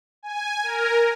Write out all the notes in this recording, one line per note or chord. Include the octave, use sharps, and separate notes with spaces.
G#5
A#4